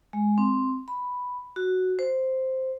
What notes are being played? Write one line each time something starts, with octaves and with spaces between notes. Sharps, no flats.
G#3
C4
B5
F#4
C5